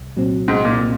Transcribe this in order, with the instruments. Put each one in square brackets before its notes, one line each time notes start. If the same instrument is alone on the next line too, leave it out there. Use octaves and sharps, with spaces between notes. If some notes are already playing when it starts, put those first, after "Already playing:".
Already playing: [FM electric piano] C2
A#2 F#3 C4
[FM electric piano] C2 [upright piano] G#2
[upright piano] A#2
[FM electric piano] A#2